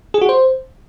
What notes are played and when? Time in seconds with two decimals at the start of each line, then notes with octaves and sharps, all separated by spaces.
0.14 G#4
0.22 F#4
0.29 C5